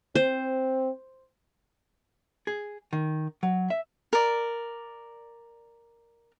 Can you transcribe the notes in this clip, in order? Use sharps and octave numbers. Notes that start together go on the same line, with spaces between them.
C4 C5
G#4
D#3
F#3
E5
A#4 D5